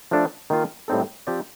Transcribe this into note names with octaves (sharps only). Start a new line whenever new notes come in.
F3 A3 D4 A4
D#3 A#3 F4
A2 G3 C4 D#4 A4
F3 C4 G4 D5